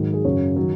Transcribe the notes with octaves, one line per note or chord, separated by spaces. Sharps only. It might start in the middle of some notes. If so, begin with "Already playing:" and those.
Already playing: G#2 D#3 F#3
G#4
F#2 C#3 F#3 C#5
D#3 F#3